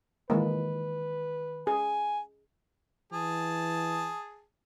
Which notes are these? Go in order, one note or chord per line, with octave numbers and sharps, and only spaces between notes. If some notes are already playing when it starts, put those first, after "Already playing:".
D#3 E3 G#3 A#3 B4
G#4 G#5
E3 G#4 A5